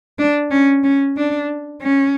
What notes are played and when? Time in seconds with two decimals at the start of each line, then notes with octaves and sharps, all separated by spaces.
0.19 D4
0.51 C#4
0.84 C#4
1.17 D4
1.82 C#4